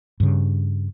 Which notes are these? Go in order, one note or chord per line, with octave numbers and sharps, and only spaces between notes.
G2 C#3